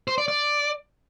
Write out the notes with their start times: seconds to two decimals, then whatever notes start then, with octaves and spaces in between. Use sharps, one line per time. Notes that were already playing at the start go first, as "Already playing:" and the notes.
0.08 C5
0.18 D5
0.28 D5